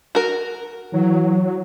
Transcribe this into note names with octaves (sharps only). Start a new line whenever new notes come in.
F#4 A#4
E3 F#3